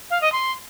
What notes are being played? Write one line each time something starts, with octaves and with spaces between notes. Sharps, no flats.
F5
D#5
C6